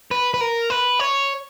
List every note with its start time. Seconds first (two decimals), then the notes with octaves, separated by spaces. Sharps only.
0.11 B4
0.34 B4
0.41 A#4
0.70 B4
1.00 C#5